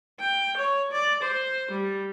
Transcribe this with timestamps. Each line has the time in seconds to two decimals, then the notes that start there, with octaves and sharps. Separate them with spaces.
0.20 G5
0.57 C#5
0.92 D5
1.23 C5
1.71 G3